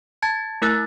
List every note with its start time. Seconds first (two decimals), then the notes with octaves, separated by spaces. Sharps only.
0.22 A5 G#6 A6
0.62 A3 E4 A#4 E6 F#6 A6